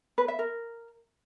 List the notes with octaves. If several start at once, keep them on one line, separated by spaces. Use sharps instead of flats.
B4
E5
A#4